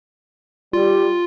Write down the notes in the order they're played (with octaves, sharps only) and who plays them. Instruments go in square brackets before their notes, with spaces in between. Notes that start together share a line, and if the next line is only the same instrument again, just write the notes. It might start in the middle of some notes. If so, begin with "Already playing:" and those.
[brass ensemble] G3 [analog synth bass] F4